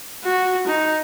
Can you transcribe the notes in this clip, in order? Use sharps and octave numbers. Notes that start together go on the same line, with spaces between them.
F#4
D#4